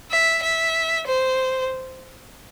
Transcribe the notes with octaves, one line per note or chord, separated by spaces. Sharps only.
E5
E5
C5